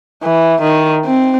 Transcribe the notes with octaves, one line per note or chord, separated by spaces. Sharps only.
E3
D#3
C4